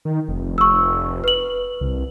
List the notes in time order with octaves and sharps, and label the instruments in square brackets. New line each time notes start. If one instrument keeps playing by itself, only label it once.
[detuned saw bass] D#3
F1
[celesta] C#6 E6
B4 F#7
[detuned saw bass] C2